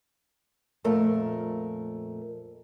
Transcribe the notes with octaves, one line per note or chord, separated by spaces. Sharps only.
F2 A#2 A3 A#4 A5